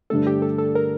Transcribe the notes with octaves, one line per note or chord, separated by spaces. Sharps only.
G2 D3 A3 D4 A4
G4
A4
A4
A#4